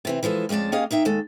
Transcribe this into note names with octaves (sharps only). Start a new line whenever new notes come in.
C3 E3 C4
E3 F3 G#3 A4
F2 G#3 C#4 D5 A5
A#3 C#4 G4 G#4 D#5 F5
A#3 D#4 E5 G5
D#2 G#3 A4